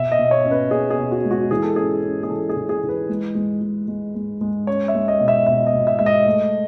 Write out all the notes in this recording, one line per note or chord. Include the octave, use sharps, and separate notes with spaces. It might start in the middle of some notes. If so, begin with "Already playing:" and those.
Already playing: B2 E5
D#5
B2
C#5
C#4
B4
C#4 G#4
G#4
B2
F#4
G#3
F#4
E3 G#4
A4
C#4 G#4
C#4
G#4
E3 A4
G#4
E3
G#4
E3
B4
G#3
G#3
G#3
G#3
G#3
G#3
C#4 C#5
E5
G#3
D#5
B2
E5
B2 E5
D#5
B2
E5
G#3 E5
D#5
A3